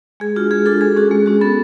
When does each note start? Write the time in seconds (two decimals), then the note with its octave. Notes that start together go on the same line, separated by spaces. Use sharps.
0.20 G#3 G#4
0.36 D4 F4 F#4
0.51 G#3 G#4
0.66 D4 F4 A4
0.81 G#3 G#4
0.96 C#4 F#4
1.11 G#3
1.26 C#4 F#4
1.41 B3 A4